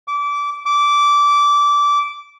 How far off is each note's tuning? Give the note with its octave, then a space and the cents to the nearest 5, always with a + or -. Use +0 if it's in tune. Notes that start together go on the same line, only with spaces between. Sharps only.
D6 -25
D6 -15